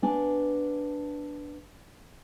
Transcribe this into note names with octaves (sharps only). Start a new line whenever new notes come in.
B3 D4 G#5